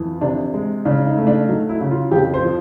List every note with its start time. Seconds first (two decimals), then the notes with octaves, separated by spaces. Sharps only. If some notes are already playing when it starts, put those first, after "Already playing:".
Already playing: F2 E3
0.21 C3 D4
0.54 G#3
0.85 C#3 D4
1.07 D#4
1.17 A3
1.27 D4
1.49 F#3 D#4
1.69 E4
1.81 C#3
1.91 F4
2.11 F2 G4
2.34 C5
2.44 F3